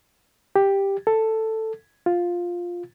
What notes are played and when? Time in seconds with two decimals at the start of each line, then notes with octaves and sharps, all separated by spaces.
0.56 G4
1.07 A4
2.06 F4